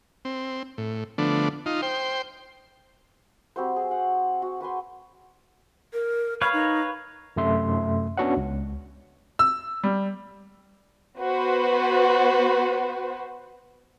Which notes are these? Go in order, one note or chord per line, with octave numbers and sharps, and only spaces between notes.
C4
A2
D3 F3 A3 B3 D4
D#4 F4
C5 G5
G3 C4 F#4 C5
G#4
F#5
F#4
F#4 B4 G#5 C6
A#4
B4 C#5 F5 B5
D#4
F#2 C3 A3 E5 C6
B3 C#4 D4 F#4 C#5 F#5
C#2
E6
G3
B3 F#4 B4 C5